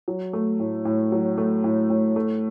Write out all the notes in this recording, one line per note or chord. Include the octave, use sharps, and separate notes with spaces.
F#3
A3
A2
A2
F#3
A3
A2
A2
A3